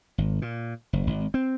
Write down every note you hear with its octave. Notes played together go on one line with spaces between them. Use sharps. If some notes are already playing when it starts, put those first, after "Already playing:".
G#1
A#2
F#1
G#1
C4